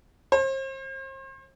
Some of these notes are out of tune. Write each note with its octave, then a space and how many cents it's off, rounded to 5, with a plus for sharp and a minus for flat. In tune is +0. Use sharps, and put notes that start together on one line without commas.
C5 +40